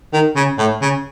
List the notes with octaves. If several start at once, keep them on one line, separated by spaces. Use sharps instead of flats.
D#3
C#3
A2
C#3